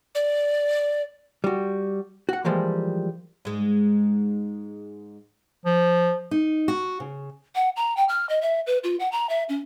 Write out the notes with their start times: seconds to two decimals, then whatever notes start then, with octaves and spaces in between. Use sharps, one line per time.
0.15 D5
1.44 G3 F#4
2.29 F#4 F#5
2.45 E3 F3 G3 G#3 A#3
3.45 G#2 G#3
5.65 F3
6.31 D#4
6.68 F#4
7.00 C#3
7.55 F#5
7.76 A#5
7.97 G5
8.09 F6
8.29 D#5
8.42 E5
8.67 B4
8.84 F4
9.00 F#5
9.12 A#5
9.29 E5
9.49 C#4